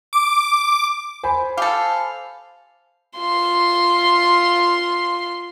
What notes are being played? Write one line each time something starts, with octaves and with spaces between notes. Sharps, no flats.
D6
C5 G#5 B5
G4 A4 F5
F4 C6